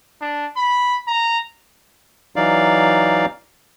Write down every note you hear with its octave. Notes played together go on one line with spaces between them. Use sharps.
D4
B5
A#5
E3 F#3 D#4 D5 F5